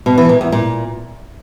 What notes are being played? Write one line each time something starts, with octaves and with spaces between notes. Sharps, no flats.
B2
E3
A#2
E2
A#2